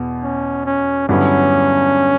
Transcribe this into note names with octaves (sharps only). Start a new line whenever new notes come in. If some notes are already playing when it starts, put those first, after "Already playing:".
Already playing: E2 B2
C#4
C#4
G2 D3 F#3 B3 C#4 E4